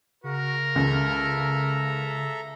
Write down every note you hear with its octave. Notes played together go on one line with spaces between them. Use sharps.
C#3 F#4 A#4
C#2 A4 E5 A#5